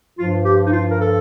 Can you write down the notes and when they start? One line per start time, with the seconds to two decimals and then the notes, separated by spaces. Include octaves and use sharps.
0.18 G2 F3 F4
0.45 G4
0.67 D#4
0.73 F4
0.91 A#4
1.01 A4